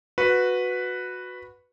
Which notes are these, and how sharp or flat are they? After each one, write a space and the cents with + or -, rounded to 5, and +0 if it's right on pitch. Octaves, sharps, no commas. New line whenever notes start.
F#4 -15 B4 +0